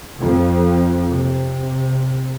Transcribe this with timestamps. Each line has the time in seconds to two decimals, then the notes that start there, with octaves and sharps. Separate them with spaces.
0.20 F2
1.10 C3